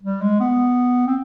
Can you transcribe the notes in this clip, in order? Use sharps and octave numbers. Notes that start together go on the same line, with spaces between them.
G3
G#3
B3
C4